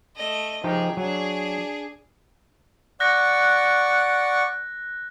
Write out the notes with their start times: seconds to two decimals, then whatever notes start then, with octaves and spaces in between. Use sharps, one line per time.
0.16 A3 D#5
0.64 F3 D#4 G4 G#4
0.97 F#3 D4 G#4
3.00 D5 F#5 C#6 F#6 G6 A#6